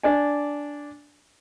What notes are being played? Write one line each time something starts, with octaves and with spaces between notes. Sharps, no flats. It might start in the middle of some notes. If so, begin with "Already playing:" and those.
D4 D5 G#5